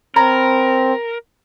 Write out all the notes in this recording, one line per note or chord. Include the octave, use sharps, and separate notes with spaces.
C4 A#4 C#5 A#5 B5